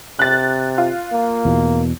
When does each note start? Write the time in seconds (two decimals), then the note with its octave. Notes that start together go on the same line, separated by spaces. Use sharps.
0.19 C3 F#6 A6
0.78 F4
1.12 A#3
1.45 E2 B2